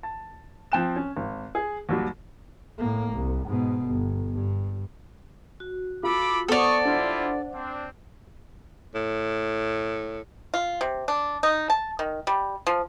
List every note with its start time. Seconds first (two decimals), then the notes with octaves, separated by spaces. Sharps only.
0.03 A5
0.72 F3 C4 G5 F#6 E7
0.96 C#4
1.17 G#1
1.55 G#4
1.89 D#2 F#3 G3
2.78 A2 A#3
3.12 C2
3.47 G#2 B2
3.86 G1
4.35 G2
5.60 F#4
6.03 F4 A4 B5 D6
6.48 B3 A4 C5 D5 F#5 C#6 D#6 F7
6.85 G3 D4 E4 F4
7.53 C4 D4
8.95 A2
10.54 F4
10.81 C3
11.08 D4
11.43 D#4
11.70 A5
11.99 D#3
12.27 G3
12.67 F3